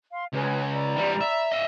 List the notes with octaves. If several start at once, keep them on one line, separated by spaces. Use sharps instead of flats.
F5 C6
C#2 G#4 B4 C#5
D5 A#5 B5
E3 G3
E5
D#5 E5